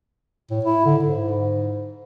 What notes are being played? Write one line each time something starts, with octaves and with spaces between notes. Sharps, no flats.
A2
E4
D3
G#2